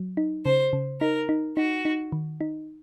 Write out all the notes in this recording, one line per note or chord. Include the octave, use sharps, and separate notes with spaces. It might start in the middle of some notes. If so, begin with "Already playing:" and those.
Already playing: F#3
D#4
C#3 C5
C#3
D#4 A#4
D#4
D#4 F#4
D#4
D#3
D#4